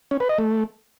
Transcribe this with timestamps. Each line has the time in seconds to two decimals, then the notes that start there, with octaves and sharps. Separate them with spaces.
0.11 C#4
0.20 B4
0.29 D#5
0.38 A3